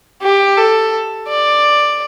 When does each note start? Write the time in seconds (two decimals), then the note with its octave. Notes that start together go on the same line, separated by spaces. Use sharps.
0.23 G4
0.57 A4
1.28 D5